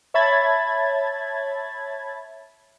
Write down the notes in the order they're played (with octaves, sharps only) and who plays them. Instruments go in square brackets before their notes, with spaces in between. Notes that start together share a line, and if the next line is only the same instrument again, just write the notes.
[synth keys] C#5 E5 A5 B5 G#6 A6